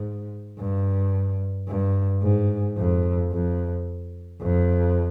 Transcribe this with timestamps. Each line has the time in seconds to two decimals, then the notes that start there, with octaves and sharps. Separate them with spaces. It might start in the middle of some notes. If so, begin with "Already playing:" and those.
Already playing: G#2
0.59 G2
1.68 G2
2.23 G#2
2.78 F2
3.32 F2
4.42 F2